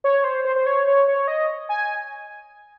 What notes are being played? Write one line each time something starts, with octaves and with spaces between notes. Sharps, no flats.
C#5
C5
C5
C5
C#5
C#5
C#5
D#5
G#5